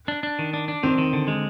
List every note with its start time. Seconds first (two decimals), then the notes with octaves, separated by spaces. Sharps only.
0.08 D4
0.23 D4
0.39 D#3
0.54 D4
0.68 D4
0.83 D#3 C4
0.98 D#3
1.13 D3
1.28 G#3